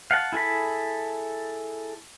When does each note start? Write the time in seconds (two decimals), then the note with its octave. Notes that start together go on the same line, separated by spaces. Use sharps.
0.11 F5 F#5 A5
0.33 E4 G#4 A4 B5